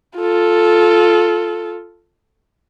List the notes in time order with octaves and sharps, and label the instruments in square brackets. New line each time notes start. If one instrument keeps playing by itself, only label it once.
[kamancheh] F4 A4